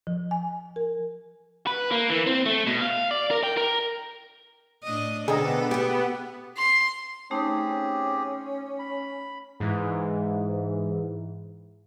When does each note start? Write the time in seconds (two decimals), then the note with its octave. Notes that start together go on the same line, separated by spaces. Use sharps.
0.07 F3
0.31 G#5
0.76 A#4
1.67 B4
1.91 A#3
2.10 E3
2.27 C4
2.46 A3
2.67 B2
2.81 F5
3.11 D5
3.31 A#4
3.44 G5
3.57 A#4
4.83 A2 D4 D#5
5.28 B2 D3 B3 C4 G#4 A4 D#5
5.71 G4 E5
6.58 C6
7.31 A3 C4 C#4 D#4 G4 G#4
8.79 B5
9.60 G#2 E3